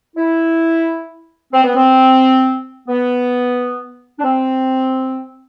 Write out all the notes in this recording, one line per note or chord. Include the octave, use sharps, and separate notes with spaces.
E4
C4
B3
C4
B3
D4
C4